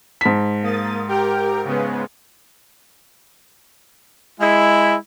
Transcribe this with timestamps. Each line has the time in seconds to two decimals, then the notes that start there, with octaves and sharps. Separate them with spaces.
0.21 G#2 A5 B6
0.62 A#3 D#6 A6
1.08 G4 A#4 G5
1.64 C#3 G#3 B3
4.40 G#3 E4